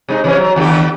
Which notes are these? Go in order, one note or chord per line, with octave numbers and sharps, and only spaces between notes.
C3 G#3 D#4
C3 E3 C#4
F#3
D#2 D3 G4